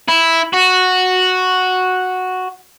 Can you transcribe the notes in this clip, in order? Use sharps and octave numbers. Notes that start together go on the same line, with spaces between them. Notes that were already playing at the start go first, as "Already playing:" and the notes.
E4
F#4